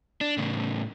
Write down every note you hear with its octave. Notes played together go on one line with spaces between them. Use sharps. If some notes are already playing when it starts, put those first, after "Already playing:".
D4
A2 C#3